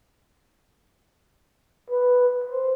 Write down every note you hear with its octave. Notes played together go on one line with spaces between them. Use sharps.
B4
C5